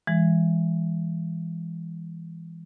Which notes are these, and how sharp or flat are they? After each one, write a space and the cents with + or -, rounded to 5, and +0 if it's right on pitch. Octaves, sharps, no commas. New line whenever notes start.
E3 +15 G#3 -20